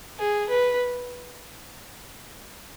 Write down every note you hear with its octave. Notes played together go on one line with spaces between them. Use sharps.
G#4
B4